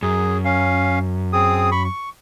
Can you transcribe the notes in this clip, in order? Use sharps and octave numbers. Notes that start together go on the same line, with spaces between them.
F#2 G#4
C#4 F5
C4 G#4 D#6
B5 C#6
C#6